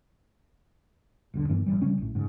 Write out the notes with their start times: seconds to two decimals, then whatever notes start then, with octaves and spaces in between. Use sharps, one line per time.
1.34 D#1 B1 D3
1.49 G2 D#3 E3 B3
1.66 A1 C#3 E3 G3
1.82 C#3 G3 C#4
1.98 A#1 A2
2.15 G#2 C#3